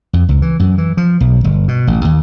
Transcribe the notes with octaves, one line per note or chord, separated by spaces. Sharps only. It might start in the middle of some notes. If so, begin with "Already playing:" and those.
F2
C#2
E3
F#2
E3
F3
B1
G1
B2
A1
D#2